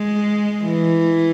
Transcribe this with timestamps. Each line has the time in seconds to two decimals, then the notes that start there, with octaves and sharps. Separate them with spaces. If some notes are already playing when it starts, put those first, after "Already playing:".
Already playing: G#3
0.63 E3